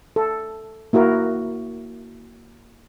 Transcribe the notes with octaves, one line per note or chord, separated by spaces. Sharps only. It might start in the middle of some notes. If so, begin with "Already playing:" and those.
A4
A#3 E4 F#4 A#4